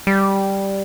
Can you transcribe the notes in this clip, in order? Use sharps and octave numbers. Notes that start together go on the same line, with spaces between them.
G3